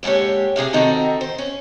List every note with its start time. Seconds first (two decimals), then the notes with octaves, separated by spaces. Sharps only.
0.03 A#2 D3 G#3 G4 C#5
0.56 A2 C3 G#4 F5
0.73 D#3 C4 D#4 F#4 A4 A#4
1.21 C5
1.38 C#4